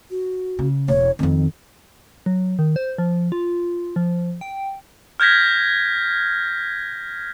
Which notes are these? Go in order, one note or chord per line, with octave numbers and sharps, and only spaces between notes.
F#4
C#3
E1 C#5
F2 D#3 C4
F#3
D#3
C5
F3
F4
F3
G5
F6 G6 G#6 A#6 B6